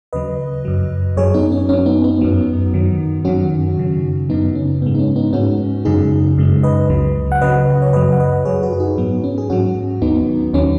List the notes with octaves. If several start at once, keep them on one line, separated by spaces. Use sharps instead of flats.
D#2 C#3 F#3 B4 D#5
F#2 F#3
F#2 F#3 G#4 C#5
B3 D#4
C#4
F#2 F#3 C#4
B3 D#4
B3 D#4
F#2 F#3
F#2 D#3 F#3
F#2 D#3 F#3 C#4 F#4
F#2 C#3 F#3
F#2 C#3 F#3 B3 D#4
C#4
G#2 G#3 B3
D#4
C#4
B3 D#4
G#2 G#3 C#4 F#4
F#2 C#3 G#3 D#4 G#4
F#2 C#3 G#3
B4 D#5
C#2 C#3 F#3
F#5
C#2 C#3 F#3 B4 D#5
C#5
F#2 F#3 B4 D#5
F#5
B4 D#5
F#2 F#3 G#4 C#5
F#4 B4
F#4
D#4 G#4
G#2 F#3 B3
C#4
G#4
G#2 F#3 C#4 F#4
D#2 D#3 F#3 B3 D#4
D#2 D#3 F#3 C#4